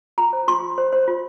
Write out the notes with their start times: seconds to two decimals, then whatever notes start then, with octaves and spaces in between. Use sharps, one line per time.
0.18 F4 A#5
0.33 C5
0.48 F4 C6
0.63 F4
0.78 C5
0.93 C5
1.08 F4